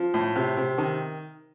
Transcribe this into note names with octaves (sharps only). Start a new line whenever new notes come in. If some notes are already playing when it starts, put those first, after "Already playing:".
Already playing: F3
A2
C3
C3
D#3